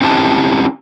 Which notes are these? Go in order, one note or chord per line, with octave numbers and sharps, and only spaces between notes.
C4 C#4 E4 G4 A5